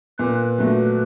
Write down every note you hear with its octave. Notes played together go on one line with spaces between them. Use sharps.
A#2 B4
F#3 A3